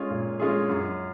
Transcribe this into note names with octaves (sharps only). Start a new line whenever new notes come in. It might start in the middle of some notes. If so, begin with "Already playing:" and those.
Already playing: G#3 C#4 F4 G#4
A#2
G#3 C#4 F4 G#4
F#2